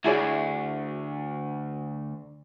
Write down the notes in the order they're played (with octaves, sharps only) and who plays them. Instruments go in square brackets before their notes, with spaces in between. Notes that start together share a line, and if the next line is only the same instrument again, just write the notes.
[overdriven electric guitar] D2 [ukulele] E4 G#4 D5